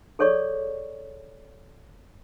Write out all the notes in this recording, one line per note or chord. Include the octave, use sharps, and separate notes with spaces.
G#4 A4 C#5 D5 C#6